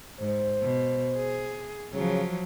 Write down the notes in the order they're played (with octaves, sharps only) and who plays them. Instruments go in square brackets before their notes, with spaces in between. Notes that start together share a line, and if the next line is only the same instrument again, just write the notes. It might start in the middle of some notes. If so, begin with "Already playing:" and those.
[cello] G#2 [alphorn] C5
[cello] B2
G#4
[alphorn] C#3 [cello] F3 F#3